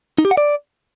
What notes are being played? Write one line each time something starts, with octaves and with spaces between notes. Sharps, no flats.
D#4
G4
F#5
D5